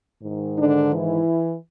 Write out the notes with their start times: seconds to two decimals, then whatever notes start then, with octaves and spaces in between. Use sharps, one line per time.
0.23 G#2 D#3
0.58 D3 D4
0.92 E3 E4